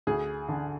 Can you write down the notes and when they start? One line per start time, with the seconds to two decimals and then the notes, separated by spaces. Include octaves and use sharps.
0.07 D2 G#4
0.48 D3